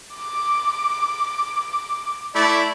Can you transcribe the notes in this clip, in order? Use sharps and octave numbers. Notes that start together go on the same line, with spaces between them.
D6
A3 E4 D5